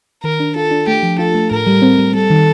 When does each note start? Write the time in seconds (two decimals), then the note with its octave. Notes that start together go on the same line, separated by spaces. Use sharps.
0.24 D#3 A#4
0.40 D4
0.55 F4 A4
0.71 D4
0.88 A3 G4
1.03 F3
1.19 F4 A4
1.35 A3
1.51 A2 A#4
1.67 G3
1.82 C4
1.98 G3
2.14 G3 A4
2.30 D#3